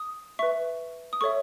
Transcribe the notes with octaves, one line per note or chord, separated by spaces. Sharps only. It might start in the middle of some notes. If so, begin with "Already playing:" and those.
Already playing: D#6
B4 E5 C#6
D#6
A4 C#5 E5 C#6